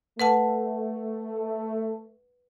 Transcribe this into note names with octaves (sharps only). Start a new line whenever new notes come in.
A3 B4 F#5 A5